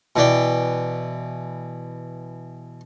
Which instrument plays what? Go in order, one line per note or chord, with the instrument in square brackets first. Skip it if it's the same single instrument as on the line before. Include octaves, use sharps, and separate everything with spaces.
[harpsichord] B2 E3 D5 G5